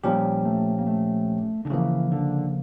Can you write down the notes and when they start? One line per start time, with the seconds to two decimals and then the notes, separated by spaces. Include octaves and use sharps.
0.04 A#2 F3 G3 C#4 G4
0.45 A3
0.79 A#3
0.87 A3
1.65 D3
1.70 C#3 E3 F3 A#3
2.12 D3